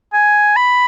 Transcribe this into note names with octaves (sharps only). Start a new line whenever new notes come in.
G#5
B5